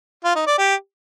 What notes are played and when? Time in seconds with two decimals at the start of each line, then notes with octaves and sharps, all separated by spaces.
0.24 F4
0.36 D#4
0.47 D5
0.58 G4